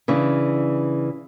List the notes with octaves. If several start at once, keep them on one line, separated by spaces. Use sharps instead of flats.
C#3 E3 D4